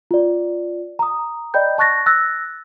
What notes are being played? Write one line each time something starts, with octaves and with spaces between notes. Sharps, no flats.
F4 D5
A#5 D#6
D5 D#5 G5 B5 G6
A5 C#6 F#6 A6 A#6
E6 F#6 A6 A#6